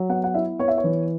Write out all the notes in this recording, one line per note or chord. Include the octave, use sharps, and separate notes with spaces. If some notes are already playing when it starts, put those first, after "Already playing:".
Already playing: F#3
B3 F#5
F#5
E4 E5
B3 C#5
E5
C#5
E3